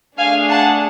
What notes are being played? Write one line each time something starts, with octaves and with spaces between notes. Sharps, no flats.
A3 D4 G#4 F5 G#5
F#5 A5